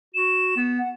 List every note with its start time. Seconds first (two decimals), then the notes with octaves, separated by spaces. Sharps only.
0.14 F#4 E7
0.56 B3
0.79 F#5